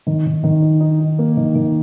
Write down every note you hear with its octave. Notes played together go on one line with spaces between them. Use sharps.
D#3
D#3
D#3
D#4
D#4
D#4
A#3
D#3
D#3